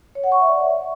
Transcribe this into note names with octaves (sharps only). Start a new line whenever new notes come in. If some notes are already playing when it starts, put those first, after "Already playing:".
C#5
F#5
C#6
E5
D5